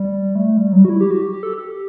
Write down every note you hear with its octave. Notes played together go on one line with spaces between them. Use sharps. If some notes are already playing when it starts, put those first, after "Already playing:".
Already playing: G3
A3
G3
F#3
G3
F#4
E4
G4
F#4
G4
G4
A4
G4